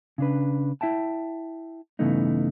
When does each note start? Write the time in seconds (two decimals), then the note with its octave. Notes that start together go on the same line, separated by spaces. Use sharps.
0.18 C#3 D4 B4
0.81 E4 E5 G5 A5
1.99 G2 C#3 E3 A3 B3 D#4